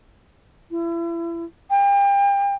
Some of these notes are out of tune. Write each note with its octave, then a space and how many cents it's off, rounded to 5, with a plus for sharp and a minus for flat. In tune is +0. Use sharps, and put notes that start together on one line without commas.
E4 +35
G5 +35